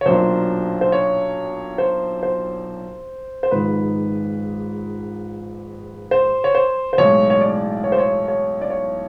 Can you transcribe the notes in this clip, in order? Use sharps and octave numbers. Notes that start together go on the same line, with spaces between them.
C#5
B1 A#2 F#3 A#3 D4 C5
C5
C#5
C5
C5
C5
A#1 G#2 D#3 G#3 B4
C5
C#5
C5
C5
B1 A2 E3 G#3 C#5
C#5
D5
C#5
C5
C#5
C#5
D5
C#5